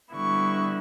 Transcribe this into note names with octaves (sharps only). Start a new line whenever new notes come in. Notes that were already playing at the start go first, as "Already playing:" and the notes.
D3 G3 B3 E4 C#6